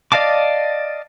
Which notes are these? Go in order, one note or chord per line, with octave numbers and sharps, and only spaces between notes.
D5 D#5 F5 A5 D6